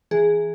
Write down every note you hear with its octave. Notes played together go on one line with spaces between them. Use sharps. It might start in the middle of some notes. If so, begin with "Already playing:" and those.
E3 G#4